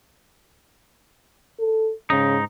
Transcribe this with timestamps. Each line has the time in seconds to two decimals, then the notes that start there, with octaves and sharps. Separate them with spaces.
1.59 A4
2.10 G#2 C#3 D#4